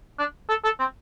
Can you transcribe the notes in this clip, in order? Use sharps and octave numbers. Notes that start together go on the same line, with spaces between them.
D4
A4
A4
C4